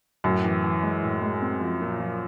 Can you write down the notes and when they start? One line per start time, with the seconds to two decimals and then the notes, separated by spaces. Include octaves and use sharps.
0.24 F#2 A2
0.44 E3
0.64 E3
0.83 G#3
1.03 A2
1.22 G#3
1.42 C4
1.61 F3
1.81 A#2
2.00 F3